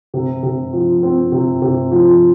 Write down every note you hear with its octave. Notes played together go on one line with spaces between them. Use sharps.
C3
C3
F3
C4
C3
C3
F3